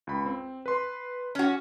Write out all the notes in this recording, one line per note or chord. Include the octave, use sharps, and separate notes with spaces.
C#2 B5
C4
B4 C6
C#4 F#4